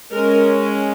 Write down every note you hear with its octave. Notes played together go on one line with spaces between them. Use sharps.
G#3 C#4 A#4